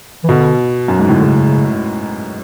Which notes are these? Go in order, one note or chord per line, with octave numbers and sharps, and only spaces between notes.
E3
B2 D3
F#2
G#2
A2 C#3
D3
C#3